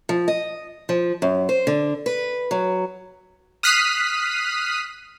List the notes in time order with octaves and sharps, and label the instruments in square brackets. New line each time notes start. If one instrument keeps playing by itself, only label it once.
[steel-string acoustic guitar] F3
D#5
F3
F#2
C5
D3
B4
F#3
[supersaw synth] D#6 F6 F#6 B6 C7 D#7